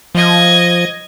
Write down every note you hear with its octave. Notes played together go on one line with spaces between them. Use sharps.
F3 D#5 G#6